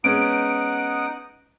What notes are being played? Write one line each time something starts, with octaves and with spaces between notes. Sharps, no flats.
G#3 B3 C#4 D#4 F#5 D#6 D7